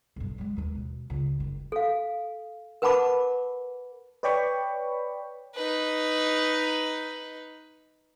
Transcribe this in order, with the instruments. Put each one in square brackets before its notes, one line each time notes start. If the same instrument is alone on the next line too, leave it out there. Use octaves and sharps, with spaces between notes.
[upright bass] B1 G2
F#3 G#3
D#2 E3
B2
C#2
F#1 D#3
[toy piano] A4 F5
A#4 B4 F#5 A5 B5 D6
[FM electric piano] B4 C#5 D5 G5 B5 C#6
[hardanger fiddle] D#4 B4